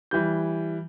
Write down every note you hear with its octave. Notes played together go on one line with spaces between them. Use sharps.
E3 G3 G6